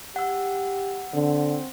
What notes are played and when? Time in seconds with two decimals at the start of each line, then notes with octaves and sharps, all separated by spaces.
0.16 G4 F#5 E6
1.14 D3 C4